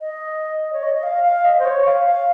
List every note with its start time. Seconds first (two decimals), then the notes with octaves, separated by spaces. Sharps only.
0.01 D#5
0.73 C#5
0.83 D#5
0.95 D#5
1.03 F5
1.24 F5
1.45 D#5
1.59 C5
1.65 C#5
1.86 F5
2.07 F5